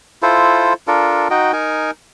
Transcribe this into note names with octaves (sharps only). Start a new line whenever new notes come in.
E4 F4 A4 C5
D4 F4 A4 A#4
D#4 F#4 D#5 G5
D#4 A#4 G#5